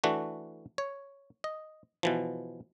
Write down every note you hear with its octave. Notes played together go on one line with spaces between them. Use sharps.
E3 A3 D4 F#4
C#5
D#5
B2 E3 F3